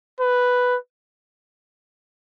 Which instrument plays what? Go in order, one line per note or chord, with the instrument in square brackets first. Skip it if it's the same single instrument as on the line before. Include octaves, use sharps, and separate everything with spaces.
[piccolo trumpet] B4